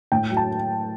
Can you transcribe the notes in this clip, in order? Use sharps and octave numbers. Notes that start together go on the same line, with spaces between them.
A2 G5
F#3
A5